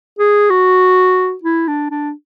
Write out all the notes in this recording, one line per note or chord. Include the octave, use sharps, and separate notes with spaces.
G#4
F#4
E4
D4
D4